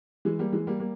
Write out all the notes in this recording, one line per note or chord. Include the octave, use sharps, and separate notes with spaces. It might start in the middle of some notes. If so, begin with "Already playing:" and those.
E3 G#3
G3 A#3
E3 G#3
G3 A#3
G3 A#3